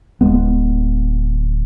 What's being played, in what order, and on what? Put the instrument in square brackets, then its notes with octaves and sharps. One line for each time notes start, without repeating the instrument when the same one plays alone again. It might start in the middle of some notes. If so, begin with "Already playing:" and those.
[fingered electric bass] D1 D2 G#3 B3